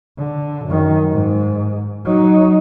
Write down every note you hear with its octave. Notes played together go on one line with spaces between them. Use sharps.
D3
F#2 D#3
G#2
F#3 D#4